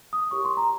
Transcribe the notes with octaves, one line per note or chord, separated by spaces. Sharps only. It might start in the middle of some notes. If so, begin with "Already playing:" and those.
D#6
E4 G4 A#4 C#5 C#6
C6
A#5